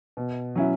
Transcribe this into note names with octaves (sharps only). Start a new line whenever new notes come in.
B2
F#3 C#4 E4